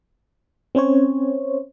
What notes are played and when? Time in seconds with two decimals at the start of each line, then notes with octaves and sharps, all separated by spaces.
0.75 C4 C#4 C5 C#5